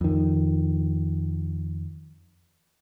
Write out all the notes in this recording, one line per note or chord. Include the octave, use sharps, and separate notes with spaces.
F2 D#3